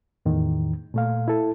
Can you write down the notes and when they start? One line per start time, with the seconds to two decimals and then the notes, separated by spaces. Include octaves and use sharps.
0.26 E2 A2 D#3
0.94 A#2 A3 F5
1.28 E4 A4